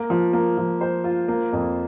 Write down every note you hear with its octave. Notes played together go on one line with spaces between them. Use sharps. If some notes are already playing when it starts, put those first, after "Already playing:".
Already playing: A#3
F3
A#3
F3
C5
F4
A#3
F2